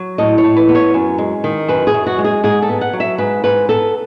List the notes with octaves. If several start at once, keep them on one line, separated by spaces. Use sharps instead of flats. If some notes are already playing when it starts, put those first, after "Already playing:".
Already playing: F#3
A2 D#5
C#5
A2
B4
B3
C#5
F#2
G#3
D#3
F#2 B4
G#4
F#2
F#4
G#3
G#4
G#2 G#4
A4
B3
F#5
F#3
E5
G#2 B4
G#2 B4
B3 A4